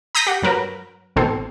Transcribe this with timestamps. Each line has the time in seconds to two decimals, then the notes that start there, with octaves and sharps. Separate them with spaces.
0.15 A#5 D#6 G6 A#6 B6
0.27 G4 F#5
0.42 G2 F#3 A#4 B4
1.16 A1 B2 C4 A4 C5